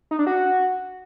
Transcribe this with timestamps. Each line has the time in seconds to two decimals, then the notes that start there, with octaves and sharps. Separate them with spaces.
0.11 D#4
0.19 D4
0.27 F#4